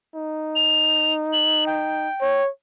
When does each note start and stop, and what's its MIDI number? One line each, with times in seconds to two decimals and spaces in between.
0.15 2.08 63
0.56 1.13 101
1.33 1.64 102
1.66 2.42 79
2.21 2.49 73